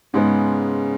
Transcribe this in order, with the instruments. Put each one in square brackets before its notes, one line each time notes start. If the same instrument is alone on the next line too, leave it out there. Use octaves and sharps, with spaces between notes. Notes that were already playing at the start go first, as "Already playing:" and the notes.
[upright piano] G#2 G#3 B3 [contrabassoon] C#3